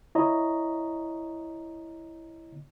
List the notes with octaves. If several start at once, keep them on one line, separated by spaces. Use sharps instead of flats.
E4 C#5 D#5 A#5